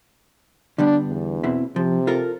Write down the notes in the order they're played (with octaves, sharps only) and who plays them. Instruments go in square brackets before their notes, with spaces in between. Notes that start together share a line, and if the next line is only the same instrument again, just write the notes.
[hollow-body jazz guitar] D3 G3 B3 [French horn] D4
[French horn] E2
[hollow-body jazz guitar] B2 C4 E4
[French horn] C3 [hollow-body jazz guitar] F3
[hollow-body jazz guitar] F4 A4 A#4